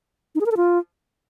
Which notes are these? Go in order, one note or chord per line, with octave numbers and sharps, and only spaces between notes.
D#4
G#4
A#4
A4
F4